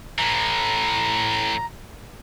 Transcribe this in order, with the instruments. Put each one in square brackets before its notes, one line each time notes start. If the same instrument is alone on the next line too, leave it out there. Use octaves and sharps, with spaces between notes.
[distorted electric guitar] A2 E3 [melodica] A#5